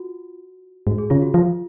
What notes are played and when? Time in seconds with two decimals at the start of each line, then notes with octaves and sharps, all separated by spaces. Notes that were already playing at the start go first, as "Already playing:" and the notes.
Already playing: F4 F#4
0.87 G#2 F#4
0.98 G#4
1.10 C#3 F4
1.22 F#4
1.34 F3 F4